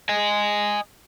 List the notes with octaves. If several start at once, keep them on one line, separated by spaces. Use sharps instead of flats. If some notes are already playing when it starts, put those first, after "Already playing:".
D#5 G#5